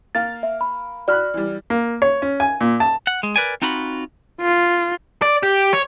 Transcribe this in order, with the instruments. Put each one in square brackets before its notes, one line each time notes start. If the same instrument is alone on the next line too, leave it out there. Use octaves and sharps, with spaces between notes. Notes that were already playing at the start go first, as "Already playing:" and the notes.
[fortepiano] A#3 F5 [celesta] A6
[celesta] E5
B5
[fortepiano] F#4 B5 F#6 [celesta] D5 F6
[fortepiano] E3 G3
A#3
C#5
C#4
G#5
A#2
A5
[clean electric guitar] F#5
G#3
A#4 B4 D5 G#5
C4 D#4 F4 F#4 B5
[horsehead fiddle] F4
[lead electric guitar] D5
G4
C#5